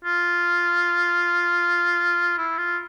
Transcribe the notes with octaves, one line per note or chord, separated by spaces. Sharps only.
F4
E4
F4